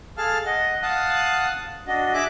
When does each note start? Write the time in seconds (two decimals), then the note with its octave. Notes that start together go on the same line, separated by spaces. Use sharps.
0.18 G#4 A4 F5 A5 F6
0.46 D#5 F#5
0.83 F5 F#5 A5 D#6 F#6
1.87 D4 F#4 D#5
2.14 G#4 E5 D6 F#6